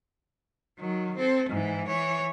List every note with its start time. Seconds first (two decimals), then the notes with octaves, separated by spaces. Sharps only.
0.79 D#3 F#3
1.17 C4 A4
1.49 G#2 E3
1.87 E3 C#5